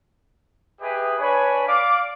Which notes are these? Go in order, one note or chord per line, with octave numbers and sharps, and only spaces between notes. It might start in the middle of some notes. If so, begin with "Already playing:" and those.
G4 G#4 B4 D#5 E5
D4 B4 C#5 G#5 B5
D5 F5 D6